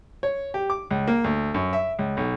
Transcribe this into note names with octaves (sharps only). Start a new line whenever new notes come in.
C#5
G4
D6
C#2
A#3
D2
F#2
E5
C#2
B1